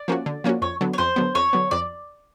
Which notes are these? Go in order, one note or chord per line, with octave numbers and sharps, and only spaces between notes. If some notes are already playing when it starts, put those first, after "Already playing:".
Already playing: D5
F3 A#3 C#4 F#4
D3
F3 A#3 C#4 F#4
F2 C#5
D3 F#3 B3
C#5
F2 C5
D3 F#3 B3
F2 C#5
D3 F#3 B3
F2 D5